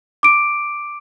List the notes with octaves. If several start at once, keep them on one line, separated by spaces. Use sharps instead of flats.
D6 D7